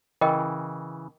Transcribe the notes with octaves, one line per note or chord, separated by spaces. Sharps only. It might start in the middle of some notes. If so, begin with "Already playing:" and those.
C#3 E3 A#4 D#5 G5